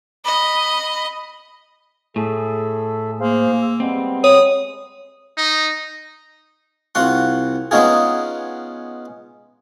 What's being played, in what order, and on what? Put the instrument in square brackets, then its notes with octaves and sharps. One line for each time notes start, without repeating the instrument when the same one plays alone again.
[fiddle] D#5 [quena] B5
[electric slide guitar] A2 [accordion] G#4 A4 E5
[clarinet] A#3 [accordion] G#4 C5 F5
[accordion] E6
[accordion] G3 G#3 B3 [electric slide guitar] C4
[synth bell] C#5 [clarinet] D#6
[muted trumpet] D#4
[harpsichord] C2 F4 F#4 F#5 C6
G#3 B3 C#4 D#4 F4 G#4